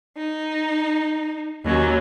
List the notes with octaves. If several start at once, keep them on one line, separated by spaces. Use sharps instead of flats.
D#4
D#2 F#3 C#4